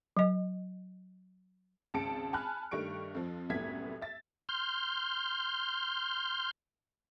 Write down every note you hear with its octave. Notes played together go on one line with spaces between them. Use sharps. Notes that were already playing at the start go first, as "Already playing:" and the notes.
F#3 D#5
G#1 C#2 A5 C#7 D7
G#5 A5 B5 F6 F#6
G2 D#3 G3 A3 C#6 D7
F2 F3
C2 F#2 A2 B3 G#6 B6
E5 A6
C6 F6 G6